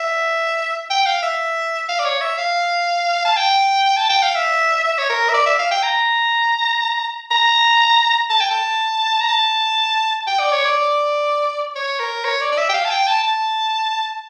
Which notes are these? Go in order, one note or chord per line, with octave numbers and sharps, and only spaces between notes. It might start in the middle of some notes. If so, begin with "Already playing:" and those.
Already playing: E5
G5
F5
E5
F5
D5
C#5
E5
F5
A5
G5
A5
G5
F5
E5
E5
C#5
A#4
E5
D5
E5
F5
G5
A#5
A#5
A5
G5
A5
A#5
A5
G5
D5
C#5
D5
C#5
A#4
C#5
D5
D5
E5
G5
F5
A5
G5
A5
A5